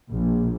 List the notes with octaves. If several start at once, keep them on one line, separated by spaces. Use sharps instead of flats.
A#1